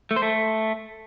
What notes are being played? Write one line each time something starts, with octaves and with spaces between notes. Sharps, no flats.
A3
C5
A3